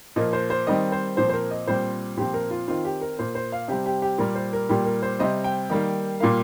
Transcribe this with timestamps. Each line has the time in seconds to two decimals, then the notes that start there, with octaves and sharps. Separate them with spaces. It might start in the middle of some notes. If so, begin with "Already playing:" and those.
0.16 A#2 F3 A#3 D#5
0.33 C5
0.50 C5
0.67 D#3 G3 C4 D#5
0.92 C5
1.17 A#2 F3 C4 C5
1.29 C5
1.33 A#4
1.51 D#5
1.67 A#2 G3 C4 C5
2.17 A#2 F3 C4 G4
2.34 A#4
2.51 F4
2.68 D#3 C4 F4
2.85 G4
3.01 A#4
3.18 A#2 A#3 C5
3.35 C5
3.52 F5
3.68 C3 G3 C4 G4
3.86 G4
4.02 G4
4.18 A#2 G3 A#3 A#4
4.35 C5
4.53 A#4
4.69 A#2 G3 A#3 G4
4.85 A#4
5.03 C5
5.19 C3 G3 C4 D#5
5.44 G5
5.70 D#3 G3 A#3
6.20 A#2 G3 A#3 F5